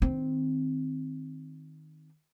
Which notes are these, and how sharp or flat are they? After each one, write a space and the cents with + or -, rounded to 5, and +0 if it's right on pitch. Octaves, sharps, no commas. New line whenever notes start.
D#3 +0 C4 -5